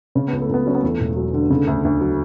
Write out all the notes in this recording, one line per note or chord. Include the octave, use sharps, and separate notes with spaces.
C#3 C#4
C#2 B3
A3
C#2 B3
F#3 C#4
B3
E2 A3
E1
F#3
D3
C#3 A3
D2
D2
F#3